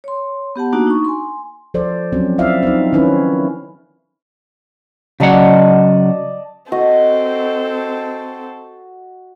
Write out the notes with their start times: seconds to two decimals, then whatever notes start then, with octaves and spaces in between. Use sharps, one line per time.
0.04 C#5 C6
0.56 B3 G4 F#5 A5
0.73 A#3 D4 D#4 F#4
0.87 D#4 C#6
1.05 G#5 C6
1.74 F3 A4 C5 D5
2.12 F3 F#3 C4 C#4
2.38 C4 E4 F4 D5 E5 F5
2.63 C4 D#4
2.93 D#3 C4 C#4 E4 B4
5.20 C#3 F#3 D5 D#5 F#5 A5
6.72 C4 F#4 A4 D#5